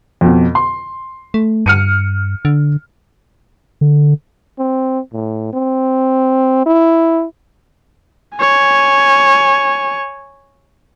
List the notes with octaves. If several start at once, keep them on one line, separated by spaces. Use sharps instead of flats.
F2 B2
C6
A3
G2 F6 C#7 D#7
D3
D3
C4
A2
C4
E4
C#5 G#5